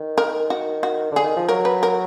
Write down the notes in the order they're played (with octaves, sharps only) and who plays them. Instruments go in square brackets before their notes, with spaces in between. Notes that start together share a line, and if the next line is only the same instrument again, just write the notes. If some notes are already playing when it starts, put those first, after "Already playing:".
Already playing: [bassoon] D#3
[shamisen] A#4
F#4
F#4
[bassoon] D3 [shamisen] G#4
[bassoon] D#3
F3
[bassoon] F#3 [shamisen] A#4
[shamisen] B4
A#4